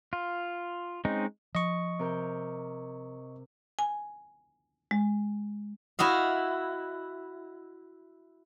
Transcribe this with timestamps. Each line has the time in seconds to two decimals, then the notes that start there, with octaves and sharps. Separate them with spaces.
0.13 F4
1.05 G#3 C4 C#4 D#4
1.55 F3 D#5 C#6
1.99 C3 A#4 G6
3.79 G#5
4.91 G#3
5.99 E4 F#4 D#5 F5